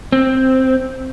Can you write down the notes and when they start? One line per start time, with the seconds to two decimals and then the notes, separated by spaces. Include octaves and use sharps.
0.12 C4